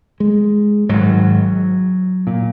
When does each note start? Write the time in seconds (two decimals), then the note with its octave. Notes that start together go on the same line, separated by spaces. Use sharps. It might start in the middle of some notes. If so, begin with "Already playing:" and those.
0.20 G#3
0.89 G#1 G#2 F#3
2.27 A#2